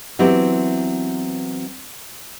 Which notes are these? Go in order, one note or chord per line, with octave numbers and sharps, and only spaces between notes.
E3 F#3 B3 C4 E4 G4